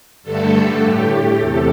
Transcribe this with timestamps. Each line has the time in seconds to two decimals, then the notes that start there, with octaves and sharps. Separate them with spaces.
0.23 G2 D3 A3 A4
0.81 A2 A3 G4
1.40 E2 C3 A4